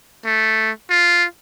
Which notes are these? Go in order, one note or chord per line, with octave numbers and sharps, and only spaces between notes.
A3
F4